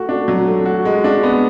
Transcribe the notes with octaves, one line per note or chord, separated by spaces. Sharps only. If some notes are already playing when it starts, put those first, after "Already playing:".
Already playing: A3 F#4
D4
F#3
A3
F#4
G#3
D4
B3